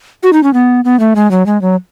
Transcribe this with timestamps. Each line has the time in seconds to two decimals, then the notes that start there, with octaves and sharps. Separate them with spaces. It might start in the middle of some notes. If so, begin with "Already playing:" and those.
0.23 F#4
0.33 D#4
0.43 C#4
0.53 B3
0.85 B3
1.00 A3
1.16 G#3
1.31 F#3
1.46 G#3
1.62 F#3